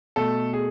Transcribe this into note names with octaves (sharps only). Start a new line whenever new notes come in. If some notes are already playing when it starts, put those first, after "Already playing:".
B2 A3 A4
G#4